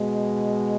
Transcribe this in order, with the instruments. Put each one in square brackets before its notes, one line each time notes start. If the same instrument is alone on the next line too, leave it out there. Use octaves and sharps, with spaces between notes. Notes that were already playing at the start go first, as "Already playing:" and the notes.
Already playing: [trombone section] B2 G#3